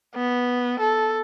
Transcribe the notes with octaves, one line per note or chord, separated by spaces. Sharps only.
B3
A4